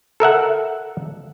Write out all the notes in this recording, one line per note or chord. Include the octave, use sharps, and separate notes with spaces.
A4 A#4 E5 F#5